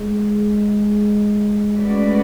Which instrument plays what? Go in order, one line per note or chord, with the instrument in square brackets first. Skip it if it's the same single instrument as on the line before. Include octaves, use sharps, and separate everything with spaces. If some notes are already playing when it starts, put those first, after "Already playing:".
Already playing: [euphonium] G#3
[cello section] A3 C#4 F#4 B4 D5